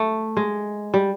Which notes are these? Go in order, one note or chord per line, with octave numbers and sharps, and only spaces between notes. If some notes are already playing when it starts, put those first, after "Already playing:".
Already playing: A3
G#3
G3